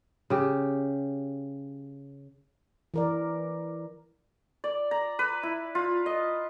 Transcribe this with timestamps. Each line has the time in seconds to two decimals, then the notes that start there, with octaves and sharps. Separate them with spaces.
0.30 C#3 G4
2.94 E3 A#4 D5
4.64 D5
4.91 A#5
5.19 B4
5.43 E4
5.75 F4
6.06 D#5